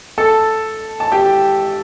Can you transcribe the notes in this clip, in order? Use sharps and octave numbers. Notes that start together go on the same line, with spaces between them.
A4 A5
A5
G4 G5